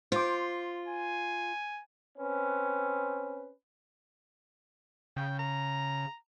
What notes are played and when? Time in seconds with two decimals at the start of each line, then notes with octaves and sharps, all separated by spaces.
0.12 F4 C5 D6
0.88 G#5
2.17 C4 C#4 B4
5.17 C#3 G5
5.39 A#5